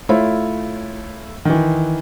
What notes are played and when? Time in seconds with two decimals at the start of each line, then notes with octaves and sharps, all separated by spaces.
0.09 A3 E4 F4 C#5
1.45 D#3 E3